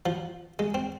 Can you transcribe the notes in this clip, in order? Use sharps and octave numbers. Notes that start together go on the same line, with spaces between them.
F3
G#3
C4